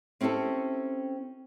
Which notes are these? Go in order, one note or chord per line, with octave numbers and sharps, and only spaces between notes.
C4 C#4 E4 G4 A4